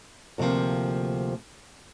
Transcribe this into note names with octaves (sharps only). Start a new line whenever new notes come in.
D2 C3 E3 F3 A#3